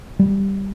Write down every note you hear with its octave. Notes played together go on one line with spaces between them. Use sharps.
G3